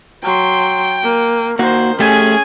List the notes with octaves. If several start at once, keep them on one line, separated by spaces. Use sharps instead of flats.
F#3 G5 C6
A#3
D#3 A#3 F#4 C5
A3 C#4 G4 G#4 G#5